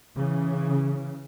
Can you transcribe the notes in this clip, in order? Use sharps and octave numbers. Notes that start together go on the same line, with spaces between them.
C#3 E3